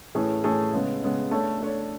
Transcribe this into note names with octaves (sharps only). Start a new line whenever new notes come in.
A2 E3 A3 C#4 G#4
A2 E3 A3 C#4 G#4
C#3 G#3 B3
C#3 G#3 B3
A3 D4 A4 C#5
A3 D4 A4 C#5